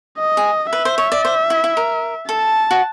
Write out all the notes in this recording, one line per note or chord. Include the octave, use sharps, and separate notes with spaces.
D#5
G#4
B4 E5
C5
C#5
D5
C5
E4
E4
A#4
A4 A5
F#4